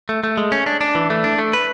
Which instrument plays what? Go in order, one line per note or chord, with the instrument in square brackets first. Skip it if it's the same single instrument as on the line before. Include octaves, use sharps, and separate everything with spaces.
[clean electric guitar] A3
A3
G#3
C#4
D4
D4
E3
A3
D4
A3
B4